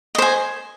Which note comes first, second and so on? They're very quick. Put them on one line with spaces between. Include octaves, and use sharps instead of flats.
D#5 C5 G#5